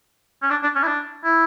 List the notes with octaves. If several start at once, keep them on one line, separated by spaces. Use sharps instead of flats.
C#4
D4
D4
C#4
E4
D4
E4